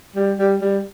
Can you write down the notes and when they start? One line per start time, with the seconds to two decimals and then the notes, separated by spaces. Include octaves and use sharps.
0.16 G3
0.39 G3
0.61 G3